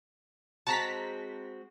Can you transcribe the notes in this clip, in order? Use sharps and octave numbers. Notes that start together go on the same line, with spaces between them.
G#3 C4 F#4 A5 A#5 B6